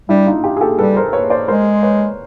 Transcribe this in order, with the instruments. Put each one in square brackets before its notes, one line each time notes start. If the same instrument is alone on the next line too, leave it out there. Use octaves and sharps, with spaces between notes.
[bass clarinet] G3 [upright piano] D4 E4
[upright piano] D#4 F4
F4 G4
G#4
G4 A4
[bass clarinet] G3 [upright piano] A4 B4
[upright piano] A#4 C5
B4 C#5
C5 D5
[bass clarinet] G#3 [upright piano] A#4 C5
[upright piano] B4 C#5